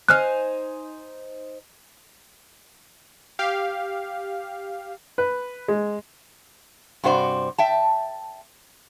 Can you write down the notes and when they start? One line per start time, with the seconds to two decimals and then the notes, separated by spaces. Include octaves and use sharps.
0.08 D#4 C5 G#5 F6 F#6
3.39 G4 F5
5.18 B4
5.68 G#3
7.04 G2 C3 F#4 C5 D5
7.58 E5 G5 A5